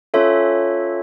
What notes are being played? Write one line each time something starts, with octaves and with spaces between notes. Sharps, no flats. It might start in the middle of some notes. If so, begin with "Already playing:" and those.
C#4 F4 A4 C#5 E5